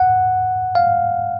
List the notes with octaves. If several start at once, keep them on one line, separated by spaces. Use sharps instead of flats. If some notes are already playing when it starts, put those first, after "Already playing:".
Already playing: F#5
F5